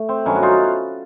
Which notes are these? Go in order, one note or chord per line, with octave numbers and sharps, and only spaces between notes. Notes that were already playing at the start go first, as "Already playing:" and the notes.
Already playing: A3
C4
G2 D#3 F#3 B3 C#4
F#4
D#4 F4